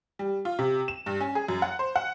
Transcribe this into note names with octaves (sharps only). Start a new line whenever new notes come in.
G3
F4
C3
E7
G2
C#4
G#4
F#2
F#5
C5
F#5